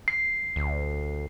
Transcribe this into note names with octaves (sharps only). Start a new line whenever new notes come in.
C7
D2